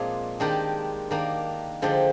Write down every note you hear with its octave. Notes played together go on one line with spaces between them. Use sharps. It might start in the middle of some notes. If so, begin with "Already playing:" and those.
Already playing: A#2 F3 G#3 C4 D4 F4 G#4
D#3 G#3 D4 G4 A#4
D#3 A#3 D4
D3 F3 G#3 D4 G4